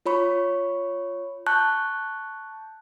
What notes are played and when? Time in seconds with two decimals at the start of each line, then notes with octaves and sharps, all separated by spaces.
0.06 F4 C#5 B5 C#6
1.47 A5 C#6 F#6 G6